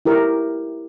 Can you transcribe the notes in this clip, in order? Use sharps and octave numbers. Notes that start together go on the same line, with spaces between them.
E4 G4 A#4